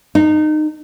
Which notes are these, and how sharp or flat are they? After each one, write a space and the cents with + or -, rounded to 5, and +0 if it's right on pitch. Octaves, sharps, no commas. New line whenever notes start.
D#4 -25